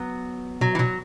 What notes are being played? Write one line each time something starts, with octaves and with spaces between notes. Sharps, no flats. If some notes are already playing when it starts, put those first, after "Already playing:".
Already playing: F#3 B3
B2 F#3
E3
B2 F#3